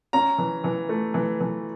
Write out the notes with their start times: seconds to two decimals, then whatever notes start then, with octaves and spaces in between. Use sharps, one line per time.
0.13 C#4 A#5
0.38 E3
0.64 E3
0.89 A3
1.14 E3
1.41 E3